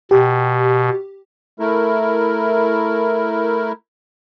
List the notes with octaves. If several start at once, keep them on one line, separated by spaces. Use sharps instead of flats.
B2 G4
A3 E4 A#4